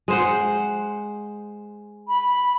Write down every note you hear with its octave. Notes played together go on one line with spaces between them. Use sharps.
G#3 C5 F#5
B5